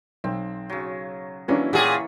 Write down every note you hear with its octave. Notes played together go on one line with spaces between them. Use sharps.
B1 C4
C#3 F#3
E3 F#3 A#3 C#4 D4 E4
A#2 E3 A#3 G4 G#4 C#5 F#5 C#6